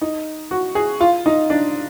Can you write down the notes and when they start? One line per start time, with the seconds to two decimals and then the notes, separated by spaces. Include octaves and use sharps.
0.01 D#4
0.51 F#4
0.75 G#4
1.00 F4
1.26 D#4
1.50 D4